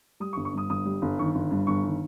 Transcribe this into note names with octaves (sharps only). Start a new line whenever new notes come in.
G3 D#6
C#6
G1
C#6
G2 D#6
G1 D#6
G3
G1
D#3 C#6
G1
G2
G1 C#6
D#3